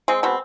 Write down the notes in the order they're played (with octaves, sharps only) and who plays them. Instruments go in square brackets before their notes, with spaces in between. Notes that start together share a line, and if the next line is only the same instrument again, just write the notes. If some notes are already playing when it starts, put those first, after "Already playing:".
[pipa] G#3 C4
B2 C4